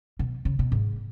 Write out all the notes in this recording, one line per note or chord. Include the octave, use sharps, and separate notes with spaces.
B2
C#3
B2
G#2